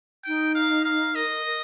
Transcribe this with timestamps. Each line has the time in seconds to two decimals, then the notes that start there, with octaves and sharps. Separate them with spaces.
0.25 D#4 G5
0.55 F5
0.85 F5
1.15 A#4 D#5
1.31 A#4
1.46 A#4